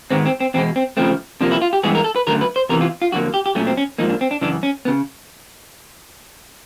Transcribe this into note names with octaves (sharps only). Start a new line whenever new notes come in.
G#2 D#3 G#3 B3 C4
C4
C4
E2 B2 G#3 C4
C4
C#3 F3 A3 C4
C3 F3 A#3 D4
E4
F4
G4
G2 E3 G#3 B3 G#4
A#4
A4
B4
F#2 D3 F#3 A3 A#4
B4
C5
E2 C3 E3 A#4
F4
F4
F2 D3 F#3 A#3 F#4
G4
G4
A#2 F#3 A3 C#4
C4
C#4
G#2 F3 A#3 D#4
D4
C4
D4
F#2 C#3 E3 D4
C#4
C#3 B3